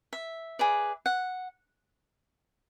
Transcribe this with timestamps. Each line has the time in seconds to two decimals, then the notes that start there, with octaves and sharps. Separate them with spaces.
0.13 E5
0.59 G#4 B4 D5
1.06 F#5